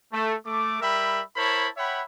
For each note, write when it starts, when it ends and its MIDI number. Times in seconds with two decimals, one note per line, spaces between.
0.12 0.35 57
0.46 0.80 57
0.46 0.80 86
0.81 1.22 55
0.81 1.22 70
0.81 1.22 76
0.81 1.22 79
0.81 1.22 83
1.36 1.68 64
1.36 1.68 70
1.36 1.68 72
1.36 1.68 73
1.36 1.68 81
1.36 1.68 83
1.77 2.03 73
1.77 2.03 76
1.77 2.03 78
1.77 2.03 79
1.77 2.03 83